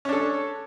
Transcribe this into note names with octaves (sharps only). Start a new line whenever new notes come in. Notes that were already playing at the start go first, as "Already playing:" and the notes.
C#4 D4 A4